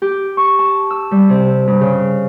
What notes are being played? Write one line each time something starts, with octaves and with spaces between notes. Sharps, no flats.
G4
C#6
A5
E6
G3
C3
G2
C#3